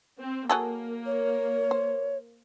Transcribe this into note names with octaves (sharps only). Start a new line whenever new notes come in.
C4
F#3 A#3 G#4 A4
C#5
C5